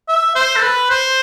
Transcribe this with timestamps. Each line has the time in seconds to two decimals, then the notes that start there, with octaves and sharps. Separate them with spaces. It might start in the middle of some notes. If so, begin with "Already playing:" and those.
0.09 E5
0.36 C5
0.56 A4
0.62 B4
0.90 C5